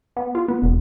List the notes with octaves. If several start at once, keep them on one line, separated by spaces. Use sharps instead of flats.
B3
F4
B3
E1